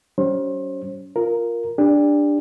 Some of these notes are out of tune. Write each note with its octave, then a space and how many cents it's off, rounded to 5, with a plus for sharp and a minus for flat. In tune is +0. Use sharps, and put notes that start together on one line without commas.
G3 -45 C#4 +30 C5 +35
F4 +0 A#4 +0
D4 +0 G4 +35